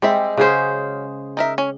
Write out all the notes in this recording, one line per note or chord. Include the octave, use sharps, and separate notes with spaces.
G3 G#3 C4 E5
C#3 F#3 C#4 G#4 C5
D#4 A#4 E5
C#4